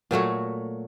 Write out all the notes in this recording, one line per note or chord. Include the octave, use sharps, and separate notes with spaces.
A#2 F#3 A3 F#4